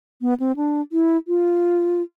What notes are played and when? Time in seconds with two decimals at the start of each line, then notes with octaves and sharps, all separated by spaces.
0.21 B3
0.40 C4
0.56 D4
0.92 E4
1.28 F4